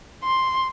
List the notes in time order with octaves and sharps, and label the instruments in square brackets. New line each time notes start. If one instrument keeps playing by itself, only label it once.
[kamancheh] C6